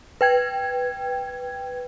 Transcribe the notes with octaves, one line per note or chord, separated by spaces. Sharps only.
B4 G5 G#6